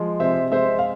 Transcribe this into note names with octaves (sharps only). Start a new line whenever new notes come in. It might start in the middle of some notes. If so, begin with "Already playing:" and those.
Already playing: F3 G#3
C3 C5 E5
G#3 C5 E5
F5